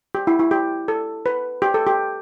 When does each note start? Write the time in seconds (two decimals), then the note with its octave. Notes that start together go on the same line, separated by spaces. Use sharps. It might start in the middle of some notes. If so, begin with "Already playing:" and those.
0.15 G4
0.27 E4
0.39 E4
0.51 G4
0.88 A4
1.26 B4
1.62 G4
1.74 A4
1.87 G4